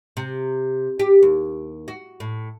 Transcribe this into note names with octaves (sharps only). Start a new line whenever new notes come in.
C3
G4
D#2
F#4
A2